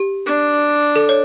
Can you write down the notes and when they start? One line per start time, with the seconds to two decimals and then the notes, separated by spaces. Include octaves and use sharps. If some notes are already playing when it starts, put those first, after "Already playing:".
Already playing: G4
0.26 D4
0.96 A4
1.09 C#5